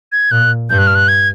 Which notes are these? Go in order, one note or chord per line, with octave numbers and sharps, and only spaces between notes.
G#6
A#2 F#6
G2 G6
F#6
F6
F#6
G#6